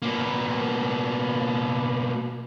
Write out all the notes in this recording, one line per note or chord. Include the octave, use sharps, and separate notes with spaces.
B2 A#3